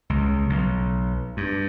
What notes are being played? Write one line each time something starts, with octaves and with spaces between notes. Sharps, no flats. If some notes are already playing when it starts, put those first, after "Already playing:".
C#2
B1
G2